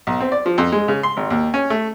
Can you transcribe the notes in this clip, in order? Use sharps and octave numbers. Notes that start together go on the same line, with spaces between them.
B1
C4
D5
F3
F2
G#3
C#3
C6
G#1
D#2
C#4
A3